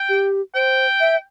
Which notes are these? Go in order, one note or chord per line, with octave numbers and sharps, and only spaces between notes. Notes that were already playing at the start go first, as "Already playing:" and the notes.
Already playing: G5
G4
C5 G5
E5